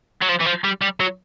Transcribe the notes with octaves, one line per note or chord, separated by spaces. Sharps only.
F#3
F3
E3
F3
G3
G3
F#3